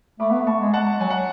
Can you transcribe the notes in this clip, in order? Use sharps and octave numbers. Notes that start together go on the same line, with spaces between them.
A3 B5 D6
B3
A3
A5 C#6
G#3
F#5 A5
F#3 G#5
F#5